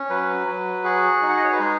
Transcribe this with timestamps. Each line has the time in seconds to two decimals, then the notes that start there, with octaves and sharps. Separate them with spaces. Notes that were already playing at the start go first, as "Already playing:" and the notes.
Already playing: C#4
0.10 F#3 B4
0.47 F#3
0.84 F#4 G#4
1.22 D#4
1.29 F#5
1.37 D#5
1.44 C#5
1.53 B4
1.59 G#3 G#4